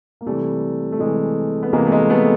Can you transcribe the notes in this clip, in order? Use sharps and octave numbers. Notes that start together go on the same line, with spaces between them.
A#3
C3 E3 G3 A3
A3
C3 E3 G#3
B3
C3 E3 G#3 A#3
A3
G#3 A#3
A3 B3